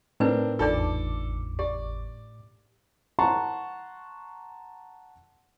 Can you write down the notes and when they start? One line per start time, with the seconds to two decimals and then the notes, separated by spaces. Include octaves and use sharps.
0.20 A2 C4 D4 D#4 A#4 B4
0.59 G#1 E2 D4 D#4 F4 A4 D5 D6
1.59 G4 D5
3.19 F#5 A5 A#5 C6 C#6